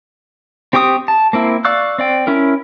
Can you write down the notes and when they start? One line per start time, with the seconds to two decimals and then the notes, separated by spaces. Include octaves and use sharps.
0.73 C4 G4 G5 C#6 D#6
1.08 A5
1.33 A#3 C4 E4
1.65 D5 F5 C#6 E6 F#6
1.98 C4 D5 G5
2.27 C#4 E4 A#4